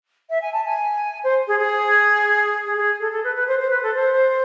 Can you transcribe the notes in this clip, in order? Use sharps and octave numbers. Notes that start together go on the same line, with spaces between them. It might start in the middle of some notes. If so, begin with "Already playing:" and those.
E5
G#5
A5
G#5
C5
G#4
G#4
G#4
G#4
A4
A4
B4
B4
C5
C5
B4
A4
C5